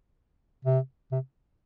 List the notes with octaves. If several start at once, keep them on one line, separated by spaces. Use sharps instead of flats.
C3
C3